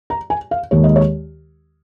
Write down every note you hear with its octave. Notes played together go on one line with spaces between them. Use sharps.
A#5
G#5
F5
D#2 D#3 G#3 C#5
D#5
C#5